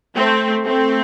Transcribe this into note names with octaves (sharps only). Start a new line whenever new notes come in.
A3 C4
A3 C4